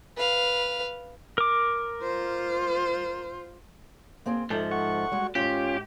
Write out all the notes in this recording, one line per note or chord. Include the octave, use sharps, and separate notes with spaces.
B4 F5
A#4 D6
F4 C5
A#3 C4 G#4
G#2 F3 A4 E5
F#5 C#6
G3 G#3 F#4
D2 G#2 C#4 F4 G4